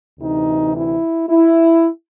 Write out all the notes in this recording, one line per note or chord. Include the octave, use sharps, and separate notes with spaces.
D2 C3 E3 D#4
E4
E4